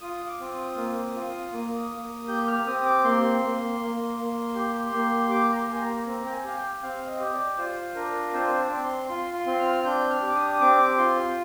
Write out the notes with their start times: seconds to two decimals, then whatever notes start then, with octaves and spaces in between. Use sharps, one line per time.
0.01 F4 D#6
0.26 D6
0.40 C4 D6
0.52 D#6
0.77 A#3
1.15 F4
1.53 A#3
1.91 A#3
2.28 G4 G6
2.47 F6
2.67 C4 D#6
2.85 D6
3.04 A#3 C6
3.42 A#3
3.80 A#3
4.18 A#3
4.55 G4
4.93 A#3
5.31 G4 D6
5.52 A#5
5.56 C6
5.69 A#3 G#5
5.81 A#5
6.06 C4 A#5
6.26 G5
6.32 G#5
6.44 G4 F5
6.57 G5
6.83 C4 F5
7.07 D#5
7.20 G4
7.33 D5
7.58 F4 C5
7.95 D4 A#4
8.33 C4 C5
8.59 D5
8.71 C4
8.84 C6
9.09 F4 C6
9.34 C6
9.47 C4
9.59 F6
9.85 D4 G6
10.10 F6
10.22 G4
10.29 D6
10.35 D#6
10.61 C4 D6
10.98 F4 C6